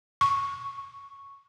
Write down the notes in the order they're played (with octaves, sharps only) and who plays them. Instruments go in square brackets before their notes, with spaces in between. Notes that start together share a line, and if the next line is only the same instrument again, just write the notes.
[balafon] C#6